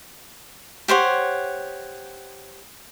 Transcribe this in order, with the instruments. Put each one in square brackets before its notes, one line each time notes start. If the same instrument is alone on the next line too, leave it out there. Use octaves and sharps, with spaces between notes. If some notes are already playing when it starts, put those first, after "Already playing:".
[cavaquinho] G4 C5 C#5 F#5